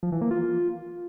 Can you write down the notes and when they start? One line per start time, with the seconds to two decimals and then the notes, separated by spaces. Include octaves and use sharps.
0.03 F3
0.12 E3
0.21 A#3
0.31 F4